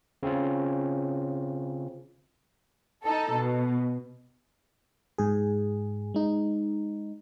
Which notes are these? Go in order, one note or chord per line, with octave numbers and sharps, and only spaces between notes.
C#3 C4 C#4 F4
D#4 A4
B2
G#2 G#4
G#3 D#4